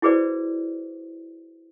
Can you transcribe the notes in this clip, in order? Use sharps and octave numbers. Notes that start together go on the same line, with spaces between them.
E4 F#4 G#4 B4 C5 D5